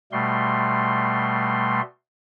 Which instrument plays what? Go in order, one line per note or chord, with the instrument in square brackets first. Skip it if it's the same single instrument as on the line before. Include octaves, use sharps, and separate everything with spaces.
[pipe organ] B2 G3 A3 C6